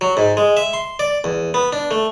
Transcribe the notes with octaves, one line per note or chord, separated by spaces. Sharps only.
F#3
G#2
G#3
E5
C6
D5
E2
B3
D4
A3